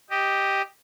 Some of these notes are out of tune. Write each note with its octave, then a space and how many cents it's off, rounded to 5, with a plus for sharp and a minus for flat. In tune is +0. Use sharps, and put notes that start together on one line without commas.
G4 +0 D#5 +0